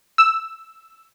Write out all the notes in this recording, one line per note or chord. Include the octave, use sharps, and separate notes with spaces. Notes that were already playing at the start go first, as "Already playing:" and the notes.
E6